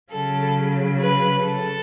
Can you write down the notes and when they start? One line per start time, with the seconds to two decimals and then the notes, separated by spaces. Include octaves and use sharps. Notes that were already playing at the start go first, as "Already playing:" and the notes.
0.12 C#3 F#3 A4
1.01 B4
1.46 A4